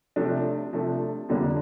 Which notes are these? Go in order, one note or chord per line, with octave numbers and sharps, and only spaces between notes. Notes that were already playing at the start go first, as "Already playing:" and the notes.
C3 F3 A3 D4
C3 F3 A3 D4
F2 D3 G3 A#3 D4